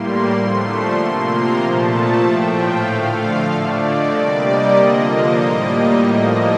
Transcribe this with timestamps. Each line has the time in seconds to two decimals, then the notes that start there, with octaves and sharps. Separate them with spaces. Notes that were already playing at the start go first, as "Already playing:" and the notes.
Already playing: A2 G3 A#3 C6
0.33 D3 F3 A3
0.97 C3 F3 A#3 C6
1.29 A#5
1.60 A#2 F3 A3 A5
2.23 A2 F3 A3 G5
2.56 F5
2.87 D3 F3 A3 F5
3.50 D3 A3 D5
3.83 D#5
4.15 C3 G3 A#3 D5
4.46 D#5
4.77 D3 F3 A#3
5.41 A2 G3 A#3
6.05 A2 F3 A#3 D#5